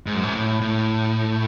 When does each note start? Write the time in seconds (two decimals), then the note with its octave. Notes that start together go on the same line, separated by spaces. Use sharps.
0.06 G#2
0.15 F#2
0.23 G#2
0.35 A2
0.61 A2